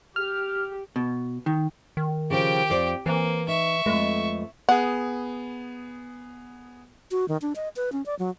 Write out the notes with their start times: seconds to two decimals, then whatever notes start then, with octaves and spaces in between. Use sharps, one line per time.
0.16 G4 F6
0.96 B2
1.46 D#3
1.97 D#3
2.30 C#3 F3 G4 G5
2.70 F2 C5 D5
3.06 E3 A#3 C4
3.48 D#4 E5 C#6
3.86 F2 G#3 A3 B4
4.69 B3 G#4 F#5
7.11 F#4
7.28 D#3
7.42 D4
7.56 D#5
7.76 B4
7.92 C#4
8.06 D5
8.19 F#3